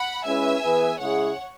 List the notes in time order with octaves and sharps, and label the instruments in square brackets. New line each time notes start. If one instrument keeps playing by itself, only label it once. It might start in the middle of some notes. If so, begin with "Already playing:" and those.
Already playing: [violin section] F#5 B5
[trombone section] G#3 C#4 E4 B4 [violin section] E5 G#5
[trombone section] E3 B3 G#4 B4
[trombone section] C#3 G#3 E4 G#4 [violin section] C#5 F#5